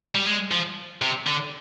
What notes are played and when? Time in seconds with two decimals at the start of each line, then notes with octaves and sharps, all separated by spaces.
0.15 G3
0.27 G#3
0.51 F3
1.02 C3
1.27 D3